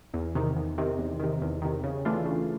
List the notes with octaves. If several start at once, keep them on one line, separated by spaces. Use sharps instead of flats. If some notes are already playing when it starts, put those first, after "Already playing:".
E2
C3 D#3
E2
C3 D#3
E2
C3 D#3
E2
C3 D#3
C#3
E3 A3 D4 F4
C#3